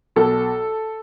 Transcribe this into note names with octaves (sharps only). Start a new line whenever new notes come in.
B1 A4